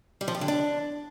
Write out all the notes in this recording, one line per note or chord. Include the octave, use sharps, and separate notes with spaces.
G3
F3
G4
D3
D4